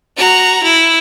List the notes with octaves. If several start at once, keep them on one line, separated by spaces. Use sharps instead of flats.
F#4 A#5
E4